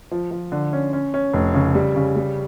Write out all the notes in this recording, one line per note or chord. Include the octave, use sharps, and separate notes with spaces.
F3
F3
D3
C#4
C#4
C#4
F1
C#3
G3
C#3
G3